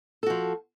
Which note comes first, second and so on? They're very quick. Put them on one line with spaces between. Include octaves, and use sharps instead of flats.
A4 F#4 F3